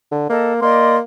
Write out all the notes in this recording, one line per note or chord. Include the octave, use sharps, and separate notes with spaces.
D3
A#3 A4 D#5
A#3 D5 D#5 C6